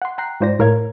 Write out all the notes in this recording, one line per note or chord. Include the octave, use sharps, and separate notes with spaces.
F#5 C6
G5 A#5 F#6 C7
G#2 F4 C5 D5 A#6
A2 A#4 C#5 F5 G#6